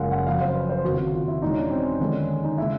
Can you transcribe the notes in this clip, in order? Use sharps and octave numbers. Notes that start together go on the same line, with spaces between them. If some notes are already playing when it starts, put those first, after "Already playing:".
Already playing: F#1 F#2 C#3 F3 G#3 F5 F#5
F#5
F2 C#3 F#3 F5
C5
B4
C5
F1 D#2 C#3 F#4
F4
E4
E2 B2 G#3 D#4
C#4
D4
C4
D#2 D3 F3 G#3 C#4
D#4
C#3 E3 G#3 E4